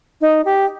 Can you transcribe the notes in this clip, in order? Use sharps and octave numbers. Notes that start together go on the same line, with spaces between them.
D#4
G4